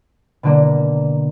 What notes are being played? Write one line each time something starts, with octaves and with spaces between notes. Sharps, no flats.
B2 D3 A#3